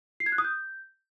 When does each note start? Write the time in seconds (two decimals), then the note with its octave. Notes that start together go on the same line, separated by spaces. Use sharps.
0.20 C7
0.26 G#6
0.32 F#6
0.38 D#6
0.44 G6